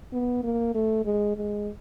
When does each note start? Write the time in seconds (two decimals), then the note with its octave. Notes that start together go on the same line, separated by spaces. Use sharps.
0.13 B3
0.44 A#3
0.75 A3
1.05 G#3
1.37 G#3